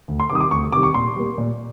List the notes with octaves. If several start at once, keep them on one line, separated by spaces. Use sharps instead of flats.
D2
C6
C3 D#3 G3 D6 D#6
D6
D2 C#6
C3 D#3 G3 D6
C#6
A#2 C6
G3 A#3
A#2